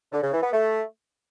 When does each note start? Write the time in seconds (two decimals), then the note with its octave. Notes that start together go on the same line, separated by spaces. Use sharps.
0.12 D3
0.22 C#3
0.33 E3
0.43 B3
0.53 A3